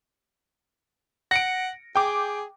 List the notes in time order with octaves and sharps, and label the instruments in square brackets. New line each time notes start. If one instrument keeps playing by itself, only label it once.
[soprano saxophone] F#5 [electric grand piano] A#6 C#7 D7
[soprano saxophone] G#4 [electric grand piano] G5 D6